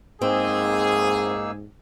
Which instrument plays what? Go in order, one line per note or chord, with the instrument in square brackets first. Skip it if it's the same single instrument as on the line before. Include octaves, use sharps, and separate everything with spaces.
[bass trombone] G#2 [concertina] A#3 D#4 E6 [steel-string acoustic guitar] C4 [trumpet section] G#4